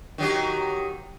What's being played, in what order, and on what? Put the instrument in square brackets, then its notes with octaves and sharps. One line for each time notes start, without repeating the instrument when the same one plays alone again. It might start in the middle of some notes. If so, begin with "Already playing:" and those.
[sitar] D#3 F#3 G4